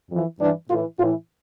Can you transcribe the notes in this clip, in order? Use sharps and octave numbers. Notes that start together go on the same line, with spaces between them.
F2 E3
G2 E3 D4
A2 E3 F4
A2 E3 F4